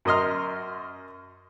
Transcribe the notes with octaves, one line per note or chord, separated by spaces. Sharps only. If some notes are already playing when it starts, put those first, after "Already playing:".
F#2 A#4 D#5 C6 F6